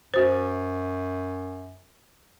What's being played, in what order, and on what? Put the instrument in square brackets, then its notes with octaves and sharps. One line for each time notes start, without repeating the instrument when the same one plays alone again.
[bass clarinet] F#2 [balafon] F#4 C5